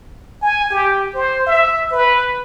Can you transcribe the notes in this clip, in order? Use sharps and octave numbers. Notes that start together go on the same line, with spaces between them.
G#5
G4
C5
E5
B4